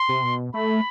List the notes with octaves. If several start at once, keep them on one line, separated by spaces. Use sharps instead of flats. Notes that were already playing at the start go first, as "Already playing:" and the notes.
Already playing: C6
C3
B2
A3 B5